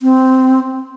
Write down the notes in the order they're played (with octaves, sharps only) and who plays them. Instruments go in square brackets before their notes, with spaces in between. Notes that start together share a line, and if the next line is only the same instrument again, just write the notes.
[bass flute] C4